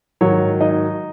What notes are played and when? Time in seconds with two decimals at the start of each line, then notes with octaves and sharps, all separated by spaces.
0.21 G#2 D#3 F#3 C#5
0.61 D#4 D#5